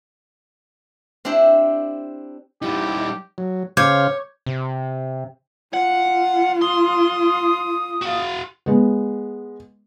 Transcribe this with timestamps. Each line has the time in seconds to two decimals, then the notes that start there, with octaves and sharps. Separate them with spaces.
1.25 C4 D4 E4 G4
2.62 G3 D#4 E4 G4
3.38 F#3
3.77 C#3 C5 C#5 F5 D6 G6 G#6
4.46 C3
5.74 F4 F#5
6.62 C6 D#6
8.02 F#4 F5
8.66 G#3 B3